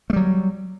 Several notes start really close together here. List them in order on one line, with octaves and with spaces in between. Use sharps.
A3 G3 F#3